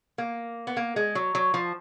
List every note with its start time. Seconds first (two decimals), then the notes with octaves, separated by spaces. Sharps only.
0.18 A#3
0.67 B3
0.77 A#3
0.96 G#3
1.15 F#3
1.35 F#3
1.54 F3